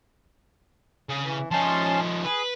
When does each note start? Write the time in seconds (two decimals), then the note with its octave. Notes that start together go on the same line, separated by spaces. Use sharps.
1.09 C#3
1.23 E3
1.51 F3 C#4 D#4 A5 C6
2.24 G#4 B4